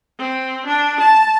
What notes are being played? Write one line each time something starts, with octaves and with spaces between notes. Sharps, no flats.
C4
D4
A5